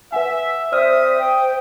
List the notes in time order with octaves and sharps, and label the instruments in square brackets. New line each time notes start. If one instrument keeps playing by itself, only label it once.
[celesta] B4 F#5 G#5 [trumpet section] E5
[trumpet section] C4 D#6 [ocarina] C5 [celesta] D5 F6 [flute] E5
[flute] G5